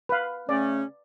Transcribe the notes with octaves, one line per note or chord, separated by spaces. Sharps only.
B4 F5
C#3 A3 C#4 D5